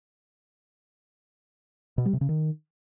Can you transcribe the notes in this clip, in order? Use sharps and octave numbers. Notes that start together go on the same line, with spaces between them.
B2
G3
C3
C#3
D#3